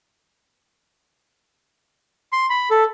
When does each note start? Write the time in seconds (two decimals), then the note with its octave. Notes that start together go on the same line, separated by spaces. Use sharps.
2.32 C6
2.50 B5
2.71 A4